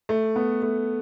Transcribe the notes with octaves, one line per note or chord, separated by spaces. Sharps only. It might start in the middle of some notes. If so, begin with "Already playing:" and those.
A3
B3
A3